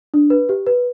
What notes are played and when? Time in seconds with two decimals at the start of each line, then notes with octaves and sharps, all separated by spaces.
0.14 D4
0.30 B4
0.49 G4
0.66 B4